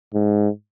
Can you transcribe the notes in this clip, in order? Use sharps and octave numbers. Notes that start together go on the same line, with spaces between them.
G#2